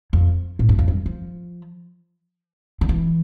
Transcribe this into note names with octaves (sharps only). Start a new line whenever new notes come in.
F2
A2
G2
F2
G2
F3
D3
E3